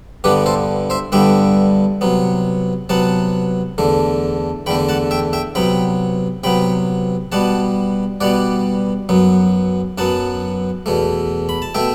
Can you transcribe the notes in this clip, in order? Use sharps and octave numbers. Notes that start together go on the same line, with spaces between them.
G2 D3 G3 B3 G4 B4
A4 C5
C5 E5
G2 D3 G3 B3 E5 G5
C3 F#3 B3
C3 F#3 B3 F#5 A5
E2 D3 A3
E2 D3 A3 G5 B5
F#5 A5
E5 G5
E5 G5
C3 F#3 B3 G5 B5
C3 F#3 B3 G5 B5
B2 G3 B3 F#5 A5
B2 G3 B3 D5 F#5
F#2 F#3 B3
F#2 F#3 B3 F#5 A5
E2 B2 A3
B5
A5
B2 A3 E5 G5